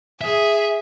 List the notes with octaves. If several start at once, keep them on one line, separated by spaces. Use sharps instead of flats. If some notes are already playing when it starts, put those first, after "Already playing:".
G#4 E5